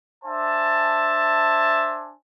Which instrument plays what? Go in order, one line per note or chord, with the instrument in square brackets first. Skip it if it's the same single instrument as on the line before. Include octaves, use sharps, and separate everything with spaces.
[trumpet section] D4 C5 E5 G#5 A5